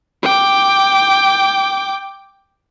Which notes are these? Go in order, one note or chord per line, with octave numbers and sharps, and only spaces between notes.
G5 D6